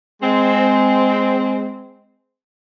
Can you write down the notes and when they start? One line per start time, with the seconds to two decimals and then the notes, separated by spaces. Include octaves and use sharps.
0.23 G#3 C4